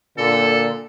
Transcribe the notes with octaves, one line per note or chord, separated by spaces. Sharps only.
A#2 D3 A4